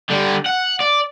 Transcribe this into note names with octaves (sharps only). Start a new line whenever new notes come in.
D3 G3
F#5
D5